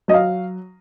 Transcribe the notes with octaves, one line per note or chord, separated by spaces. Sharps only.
F#3 D#5
F5